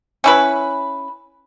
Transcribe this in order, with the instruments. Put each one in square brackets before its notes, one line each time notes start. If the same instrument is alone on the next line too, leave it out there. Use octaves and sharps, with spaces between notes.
[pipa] C#4 E4 B4